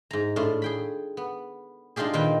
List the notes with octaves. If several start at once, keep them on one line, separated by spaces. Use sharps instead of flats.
G#2 A#5
A2 D4 F4
G#4 G5 B5
B3
G#3 D4 D#4 F4 G4 G#4
A#2 D#3 A#3 C4 B4 G5